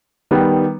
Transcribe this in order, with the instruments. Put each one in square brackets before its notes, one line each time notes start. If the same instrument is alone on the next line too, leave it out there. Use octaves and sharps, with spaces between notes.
[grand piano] D#3 G3 B3